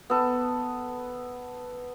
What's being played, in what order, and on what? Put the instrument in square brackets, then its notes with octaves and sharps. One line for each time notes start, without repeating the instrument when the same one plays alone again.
[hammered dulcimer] B3 A4